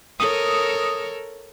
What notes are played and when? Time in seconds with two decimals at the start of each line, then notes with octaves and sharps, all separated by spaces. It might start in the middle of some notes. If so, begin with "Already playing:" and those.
0.20 A4 A#4 C#5 D#6